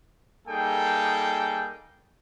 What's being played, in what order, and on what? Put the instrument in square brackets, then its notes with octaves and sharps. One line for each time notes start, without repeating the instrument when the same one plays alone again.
[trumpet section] G3 A#3 D#4 G#4 A4 G5